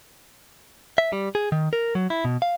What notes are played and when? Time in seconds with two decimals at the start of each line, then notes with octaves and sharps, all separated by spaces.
0.98 E5
1.13 G3
1.35 G#4
1.52 D#3
1.73 A#4
1.95 F#3
2.10 E4
2.25 B2
2.42 F5